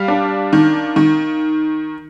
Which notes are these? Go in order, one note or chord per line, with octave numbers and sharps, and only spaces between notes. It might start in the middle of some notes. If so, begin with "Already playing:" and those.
Already playing: G3 F5
D4
D#3
D#3